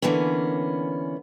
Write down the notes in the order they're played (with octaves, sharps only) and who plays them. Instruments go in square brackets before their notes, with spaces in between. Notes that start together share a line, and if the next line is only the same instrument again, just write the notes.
[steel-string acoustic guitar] D3 E3 A#3 B3 C#4